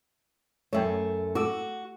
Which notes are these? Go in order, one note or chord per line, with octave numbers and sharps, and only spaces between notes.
F#2 A3 C#5 E5 G5
F#4 A4 D6 E6